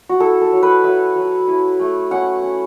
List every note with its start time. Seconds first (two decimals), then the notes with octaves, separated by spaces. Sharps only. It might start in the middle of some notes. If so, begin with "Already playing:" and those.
0.09 F#4
0.20 E4 A4
0.41 A4
0.52 F#3
0.63 B4
0.84 F#3 E5
1.16 F#3
1.48 E4
1.79 A3
2.11 C#4 F#5
2.42 C#4